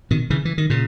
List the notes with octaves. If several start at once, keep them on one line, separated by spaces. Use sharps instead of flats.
B2 D#3
C#3 E3
E3
D#3
A#2 C#3